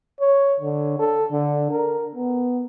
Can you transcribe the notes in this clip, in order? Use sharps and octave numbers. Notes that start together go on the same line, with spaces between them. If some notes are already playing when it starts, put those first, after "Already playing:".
C#5
D3
A4
D3
A#4
B3